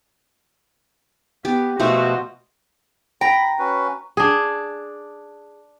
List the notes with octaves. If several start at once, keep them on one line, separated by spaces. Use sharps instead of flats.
B3 G4
B2 F3 A3 F#4 C5
G5 A#5 B5
C#4 F#4 B4
D4 G#4